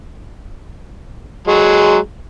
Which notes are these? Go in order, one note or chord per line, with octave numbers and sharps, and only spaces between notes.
F#3 G#3